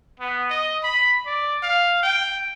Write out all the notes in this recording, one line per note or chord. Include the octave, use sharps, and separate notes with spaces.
B3
D#5
B5
D5
F5
G5